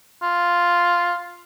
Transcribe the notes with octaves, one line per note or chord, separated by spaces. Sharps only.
F4